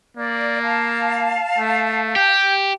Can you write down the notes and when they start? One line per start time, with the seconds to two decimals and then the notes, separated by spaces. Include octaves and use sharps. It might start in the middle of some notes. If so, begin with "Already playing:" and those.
0.17 A#3 D5
0.62 F5 A5
1.58 A3
2.16 G4 G5